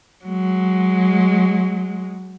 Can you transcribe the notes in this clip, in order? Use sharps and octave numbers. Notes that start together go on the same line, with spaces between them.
F#3 G#3